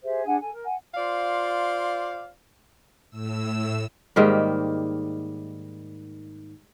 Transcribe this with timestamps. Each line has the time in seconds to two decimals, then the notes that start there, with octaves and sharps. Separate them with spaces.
0.03 G4 G#4 C5 E5
0.26 D4 G#4 F#5 G#5
0.40 A4 G#5
0.52 A#4
0.65 F#5 G#5
0.95 F4 C5 D5 F5
3.10 A2 E6
4.16 G#2 D#3 G3 A#3